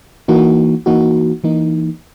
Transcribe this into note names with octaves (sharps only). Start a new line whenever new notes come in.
E3 A#3 D#4 F#4
E3 A#3 D#4 F#4
E3 A#3 D#4